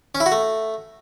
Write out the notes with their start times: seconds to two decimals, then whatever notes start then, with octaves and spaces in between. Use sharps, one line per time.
0.15 C#4
0.20 E4
0.26 F#4
0.32 A3